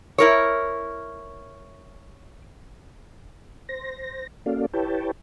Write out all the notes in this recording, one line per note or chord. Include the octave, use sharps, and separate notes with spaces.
E4 A#4 C#5
C5 A#6
A#3 C#4 F#4 A4 D5 F5
E4 G4 B4 C#5 G5 A5